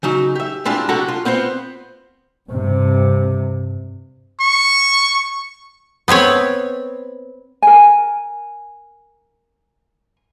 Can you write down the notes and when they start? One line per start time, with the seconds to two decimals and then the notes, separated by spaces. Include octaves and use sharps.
0.03 C#3 F#3 D#4
0.35 G4 E5
0.65 G#3 C4 D4 E4 F4 G4
0.89 C3 F#3 D4 F#4 A4 A#5
1.08 F4
1.25 B3 C4 F4 C5
2.50 G2 C3
4.40 C#6
6.08 B3 C4 B4 C#5
7.62 A#4 G#5